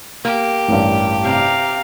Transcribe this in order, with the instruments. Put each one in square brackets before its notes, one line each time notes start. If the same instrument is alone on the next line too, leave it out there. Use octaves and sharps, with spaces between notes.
[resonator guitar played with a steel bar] A#3 [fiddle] G4
[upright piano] A1 G2
[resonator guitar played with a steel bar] C3 [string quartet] F5 A#5